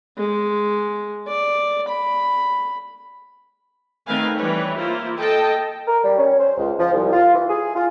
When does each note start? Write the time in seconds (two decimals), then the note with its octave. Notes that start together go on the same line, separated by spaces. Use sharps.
0.18 G#3
1.28 D5
1.88 B5
4.07 D#3 A3 C4 B4 F5 G#5
4.37 E3 G3 B4 C#5
4.76 A#3 E4 F4 C5
5.17 A4 D#5 G5 A5
5.87 A#4
6.03 G3
6.18 C#4
6.39 C5
6.58 C#2
6.79 F3
6.93 C2
7.12 F4
7.34 E3
7.49 G#4
7.76 F4